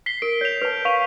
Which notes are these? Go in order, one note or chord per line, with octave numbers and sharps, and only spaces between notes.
B6 C7 G7
A#4 D7
C#5 G6 F7
B4 A5
F5 C#6 F7